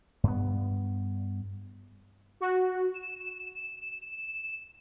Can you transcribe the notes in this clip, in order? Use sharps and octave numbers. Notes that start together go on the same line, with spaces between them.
G2 B3
F#4
E7